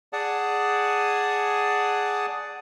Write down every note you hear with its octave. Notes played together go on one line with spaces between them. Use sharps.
G#4 D5 F#5 G#5 A5 D#6